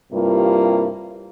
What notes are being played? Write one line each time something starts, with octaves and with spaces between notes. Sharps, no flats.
G2 C3 G3 A#3 E4 F4